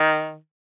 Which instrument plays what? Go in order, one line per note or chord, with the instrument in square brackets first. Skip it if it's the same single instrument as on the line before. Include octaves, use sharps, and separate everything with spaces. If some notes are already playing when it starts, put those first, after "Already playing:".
Already playing: [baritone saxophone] D#3